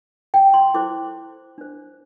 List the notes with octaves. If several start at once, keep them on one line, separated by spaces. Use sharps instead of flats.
G5
C6
E4 A4 C5 D6
D4 C5